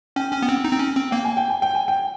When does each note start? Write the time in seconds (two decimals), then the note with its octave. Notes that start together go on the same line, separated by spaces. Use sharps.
0.16 C#4 G5
0.33 C#4
0.42 B3
0.49 C4
0.65 D#4
0.73 C4
0.79 C#4
0.96 C4
1.11 A#3 G5
1.25 G#5
1.37 G5
1.50 G#5
1.62 G5
1.75 G#5
1.88 G5